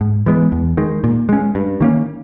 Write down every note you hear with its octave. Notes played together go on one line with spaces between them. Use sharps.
G#2
E3 G#3 B3
E2
D#3 G#3
A#2
G#3 C#4
G2
D#3 A#3 C#4